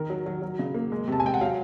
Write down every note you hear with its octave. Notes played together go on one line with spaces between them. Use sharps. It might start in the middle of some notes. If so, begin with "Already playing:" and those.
Already playing: D#3 A#4
F#3
F#3
F#3
C#3
A#3
G#3
C3 A5
G#5
G#3 G5
F#5
F#3 F5